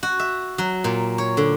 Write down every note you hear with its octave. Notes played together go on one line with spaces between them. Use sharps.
F#4
E5
F#3
A#2
C#5
D3